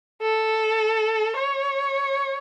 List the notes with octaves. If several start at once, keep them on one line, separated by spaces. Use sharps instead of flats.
A4
C#5